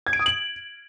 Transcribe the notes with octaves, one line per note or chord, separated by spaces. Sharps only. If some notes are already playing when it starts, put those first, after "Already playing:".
G#6
D7
D#6
F#7